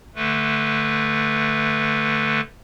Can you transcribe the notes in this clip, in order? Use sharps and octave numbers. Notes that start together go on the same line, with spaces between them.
D3 A3 B4